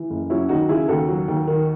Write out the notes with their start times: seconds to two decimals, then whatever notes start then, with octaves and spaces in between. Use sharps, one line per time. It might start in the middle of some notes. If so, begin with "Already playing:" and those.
Already playing: E3
0.10 F#1
0.30 F#3 C#4 E4
0.49 D#2 D#4 F#4
0.69 C#3 E4 G#4
0.88 D#2 F#4 A4
1.09 F#3
1.28 D#2
1.47 D#3